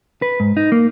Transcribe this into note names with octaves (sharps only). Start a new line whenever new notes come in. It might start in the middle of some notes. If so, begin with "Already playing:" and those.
B4
G#2
D#4
A#3